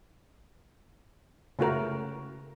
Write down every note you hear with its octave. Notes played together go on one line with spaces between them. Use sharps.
C#3 A3 F#4 A#4